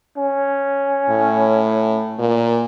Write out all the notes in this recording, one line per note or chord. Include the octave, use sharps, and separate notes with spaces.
C#4
A2
A#2